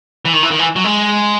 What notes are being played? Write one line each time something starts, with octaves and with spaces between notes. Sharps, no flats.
E3
D#3
E3
D#3
E3
F#3
G#3